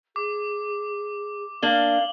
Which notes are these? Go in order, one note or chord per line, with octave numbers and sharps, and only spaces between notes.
G#4 D6
A#3 D4 F5 F#7 G7